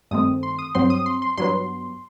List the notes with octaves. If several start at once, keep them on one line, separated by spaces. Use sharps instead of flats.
G2 D#3 A3 C4 D#6
C6
D#6
G2 F#3 C4 C6
D#6
C6
C6
G2 F#3 B3 C6